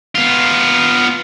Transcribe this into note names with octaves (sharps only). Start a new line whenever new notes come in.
B3 F4